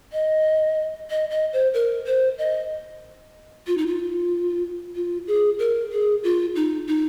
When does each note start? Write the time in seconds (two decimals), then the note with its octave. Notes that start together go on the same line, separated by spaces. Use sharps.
0.13 D#5
1.10 D#5
1.30 D#5
1.53 C5
1.74 A#4
2.07 C5
2.38 D#5
3.67 F4
3.78 D#4
3.87 F4
4.96 F4
5.27 G#4
5.59 A#4
5.92 G#4
6.23 F4
6.56 D#4
6.87 D#4